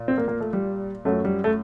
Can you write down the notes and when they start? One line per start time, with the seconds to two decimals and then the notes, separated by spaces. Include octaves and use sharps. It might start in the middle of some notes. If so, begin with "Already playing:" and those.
Already playing: A#2
0.08 C4
0.18 A#3
0.28 A#3
0.40 A3
0.53 G3
1.05 F#2 F#3 A3
1.25 G3
1.44 A3